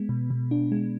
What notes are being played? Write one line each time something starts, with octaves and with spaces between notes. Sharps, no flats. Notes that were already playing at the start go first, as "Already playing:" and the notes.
Already playing: G#3 B3
B2
B2
D4
G#3